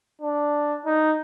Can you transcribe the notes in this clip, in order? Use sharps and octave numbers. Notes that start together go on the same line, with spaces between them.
D4
D#4